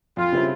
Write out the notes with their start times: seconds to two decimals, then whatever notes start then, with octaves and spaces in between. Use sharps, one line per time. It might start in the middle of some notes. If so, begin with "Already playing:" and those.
0.17 F2 F4
0.32 C#3 G3 C4 E4